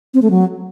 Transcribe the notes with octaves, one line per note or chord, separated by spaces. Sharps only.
C4
A3
F#3